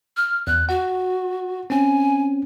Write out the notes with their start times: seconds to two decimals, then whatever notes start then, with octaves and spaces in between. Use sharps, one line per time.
0.17 F6
0.47 E2 F#6
0.69 F#4 F#5
1.70 C4 C#4 G#5